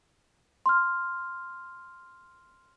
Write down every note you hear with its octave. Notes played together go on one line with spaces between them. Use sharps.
C6 F6